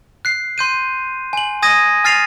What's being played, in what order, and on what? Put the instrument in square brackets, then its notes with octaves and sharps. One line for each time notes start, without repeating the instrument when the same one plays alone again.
[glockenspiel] F#6 C7
C6 G6 D#7
G#5 F#7
G#5 D#6 G#6 A#6 D#7
G#5 F6 A6 C7 D#7 F7